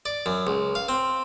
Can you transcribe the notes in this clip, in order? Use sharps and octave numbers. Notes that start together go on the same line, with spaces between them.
D5
F#2
C#2
F5
C4